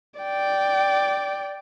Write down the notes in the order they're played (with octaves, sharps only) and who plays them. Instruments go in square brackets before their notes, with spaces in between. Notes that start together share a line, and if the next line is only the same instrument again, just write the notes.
[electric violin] D5 G5